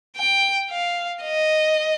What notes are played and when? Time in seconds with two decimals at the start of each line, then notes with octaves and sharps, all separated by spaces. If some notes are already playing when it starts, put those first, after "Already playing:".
0.17 G5
0.70 F5
1.23 D#5